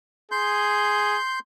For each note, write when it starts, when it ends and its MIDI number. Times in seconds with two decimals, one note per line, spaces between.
0.32 1.18 68
0.32 1.39 84
0.32 1.39 91